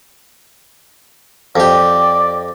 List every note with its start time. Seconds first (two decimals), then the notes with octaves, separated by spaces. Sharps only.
1.56 F2 G4 D5